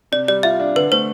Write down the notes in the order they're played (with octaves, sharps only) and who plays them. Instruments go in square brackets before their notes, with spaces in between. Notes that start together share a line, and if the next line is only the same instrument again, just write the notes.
[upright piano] C3 [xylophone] D5
[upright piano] G3 [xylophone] D5
[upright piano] F4 [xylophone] E5
[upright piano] D4
[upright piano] D3 [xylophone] B4
[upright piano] A3 [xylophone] C5